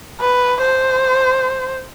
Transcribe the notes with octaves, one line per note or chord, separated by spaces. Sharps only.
B4
C5